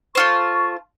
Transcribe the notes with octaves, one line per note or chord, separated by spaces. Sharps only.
A3 F4 C5 C#6